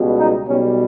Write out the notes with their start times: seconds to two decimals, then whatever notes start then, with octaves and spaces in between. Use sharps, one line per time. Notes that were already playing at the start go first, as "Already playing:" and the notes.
Already playing: C#2 B2 G3
0.18 D#4
0.47 B1 B2 G3 C#4